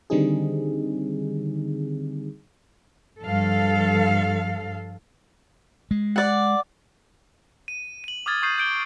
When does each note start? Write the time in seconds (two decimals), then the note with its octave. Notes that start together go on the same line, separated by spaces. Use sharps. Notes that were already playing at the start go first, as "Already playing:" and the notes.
0.10 D3 D#3 G3 C4 D#4 G#4
3.22 G2 F3 A4 F5
5.91 G#3
6.16 D5 F#5
7.68 D#7
8.04 D#7 F#7
8.26 D6 D#6 F6 G#6 A6
8.43 C#6 D#6 G6 C7 D#7
8.58 G6 D7 G7